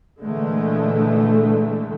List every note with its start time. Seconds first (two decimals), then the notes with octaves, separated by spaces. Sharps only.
0.20 A#2 D3 E3 G#3 A3